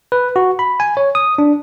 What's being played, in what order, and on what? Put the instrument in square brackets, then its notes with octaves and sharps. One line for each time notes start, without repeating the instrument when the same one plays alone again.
[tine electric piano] B4
F#4
B5
G#5
C#5
D#6
D4